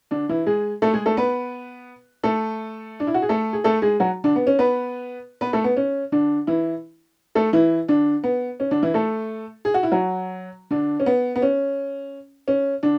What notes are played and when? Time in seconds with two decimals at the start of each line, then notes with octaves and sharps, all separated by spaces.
0.11 D3 D4
0.29 E3 E4
0.46 G#3 G#4
0.82 A3 A4
0.94 G#3 G#4
1.06 A3 A4
1.17 B3 B4
2.23 A3 A4
3.00 D4
3.07 E4
3.14 F#4
3.22 G#4
3.29 A3 A4
3.53 G#4
3.64 A3 A4
3.82 G#3 G#4
4.00 F#3 F#4
4.24 D3 D4
4.36 B3
4.47 C#4
4.59 B3 B4
5.41 B3 B4
5.53 A3 A4
5.64 B3
5.77 C#4
6.12 D3 D4
6.47 E3 E4
7.35 A3 A4
7.53 E3 E4
7.88 D3 D4
8.24 B3
8.60 C#4
8.71 D3 D4
8.83 E3 E4
8.94 A3 A4
9.65 G#4
9.74 F#4
9.83 E4
9.92 F#3 F#4
10.71 D3 D4
11.00 C#4
11.06 B3
11.36 B3
11.42 C#4
12.48 C#4
12.83 D3 D4